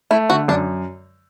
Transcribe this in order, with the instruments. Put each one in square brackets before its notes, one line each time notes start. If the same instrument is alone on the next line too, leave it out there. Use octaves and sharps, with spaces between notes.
[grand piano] A3 [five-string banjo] E4
[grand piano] D3 [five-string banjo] F#4
[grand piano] F#2 [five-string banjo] D4